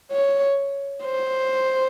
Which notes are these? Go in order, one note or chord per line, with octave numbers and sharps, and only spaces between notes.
C#5
C5